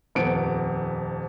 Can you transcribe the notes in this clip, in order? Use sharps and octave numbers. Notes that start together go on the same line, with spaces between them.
D#1 F2 B3 D7